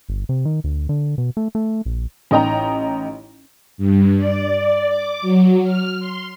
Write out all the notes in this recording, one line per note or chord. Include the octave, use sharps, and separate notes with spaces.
G1
C3
D#3
D2
D3
B2
A3
A3
A#1
A1 D#4 D#5 G5 A#5
G2
D5
D5
D6
F#3
F6
C6